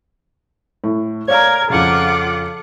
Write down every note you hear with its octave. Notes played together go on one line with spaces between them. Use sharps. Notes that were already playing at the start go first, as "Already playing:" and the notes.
A2
A#4 C#5 D5 F5 G#6
F2 C#3 F4 F#5 D6